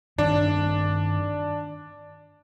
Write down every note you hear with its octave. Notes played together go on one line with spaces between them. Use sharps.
G2 D#3 G3 C4 D4